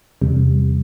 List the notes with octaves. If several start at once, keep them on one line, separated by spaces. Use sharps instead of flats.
E2 C3 G3